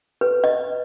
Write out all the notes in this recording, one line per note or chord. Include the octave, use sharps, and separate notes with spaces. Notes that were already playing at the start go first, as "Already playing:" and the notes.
B4
D#5